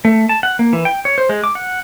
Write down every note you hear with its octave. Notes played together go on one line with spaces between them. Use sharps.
A3
A5
F#5
A#3
E3
G5
C#5
C5
G#3
D6
F#5